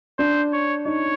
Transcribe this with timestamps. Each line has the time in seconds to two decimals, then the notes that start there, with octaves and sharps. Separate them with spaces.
0.19 D4 C5
0.53 C#5
0.85 D#4 C#5